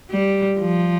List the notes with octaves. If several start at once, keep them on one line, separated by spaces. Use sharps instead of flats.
G3
F3